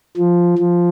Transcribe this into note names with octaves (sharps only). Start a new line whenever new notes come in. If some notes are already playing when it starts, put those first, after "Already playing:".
F3
F3